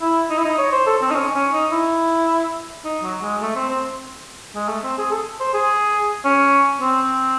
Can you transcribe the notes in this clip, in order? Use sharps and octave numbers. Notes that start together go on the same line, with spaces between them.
E4
D#4
E4
D#4
C#5
C5
A4
C4
D#4
C#4
C#4
D#4
E4
D#4
F#3
G#3
A3
C4
C4
G#3
A3
C4
G#4
A4
C5
G#4
C#4
C4